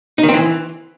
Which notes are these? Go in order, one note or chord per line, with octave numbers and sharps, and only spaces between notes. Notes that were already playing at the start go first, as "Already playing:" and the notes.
D#4
D#3
C4
E3